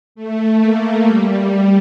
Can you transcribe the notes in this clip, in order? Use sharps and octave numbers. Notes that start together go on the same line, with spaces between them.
A3
A#3
G3